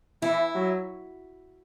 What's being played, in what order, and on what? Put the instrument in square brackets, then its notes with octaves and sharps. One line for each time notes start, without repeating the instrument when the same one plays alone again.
[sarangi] E3 [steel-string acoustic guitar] E4
[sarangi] F#3